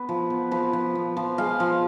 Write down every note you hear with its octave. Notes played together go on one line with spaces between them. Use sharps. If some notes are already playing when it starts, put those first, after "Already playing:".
Already playing: B3 B4
F3
B3
F3 B4
F3
B3
F3
G#3 F5
F3